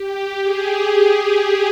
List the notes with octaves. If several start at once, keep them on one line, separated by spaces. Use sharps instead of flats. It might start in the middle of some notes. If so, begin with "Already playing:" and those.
Already playing: G4
G#4